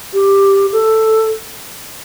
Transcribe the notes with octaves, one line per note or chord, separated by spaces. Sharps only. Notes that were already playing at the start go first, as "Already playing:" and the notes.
G4
A4